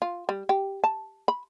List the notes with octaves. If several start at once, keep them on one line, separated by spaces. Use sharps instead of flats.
F4
G3
G4
A5
B5